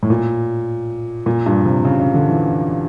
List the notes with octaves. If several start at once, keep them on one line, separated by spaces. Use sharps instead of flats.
A2
A#2
A#2
G2
C3
C#3
C#3
D3
E3